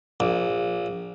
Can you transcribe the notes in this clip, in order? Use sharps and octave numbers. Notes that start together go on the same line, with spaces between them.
A#1